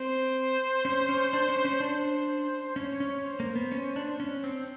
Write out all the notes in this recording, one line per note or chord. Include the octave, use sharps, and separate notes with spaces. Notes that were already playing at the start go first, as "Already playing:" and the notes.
Already playing: C4 C5
C#4
C#4
D4
C#4
C#4
D4 C5
C#4 C#5
C#4
C5
A#3
B3
C#4
D4
C#4
C4